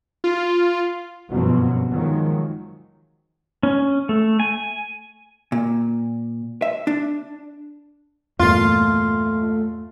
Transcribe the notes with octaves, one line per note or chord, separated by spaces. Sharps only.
F4
G1 F#2 B2 F3 F#3 C4
D#3 F3 F#3 G#3
C#4
A3
G#5
A#2
E5
D4
E2 G2 A#2 A3 F4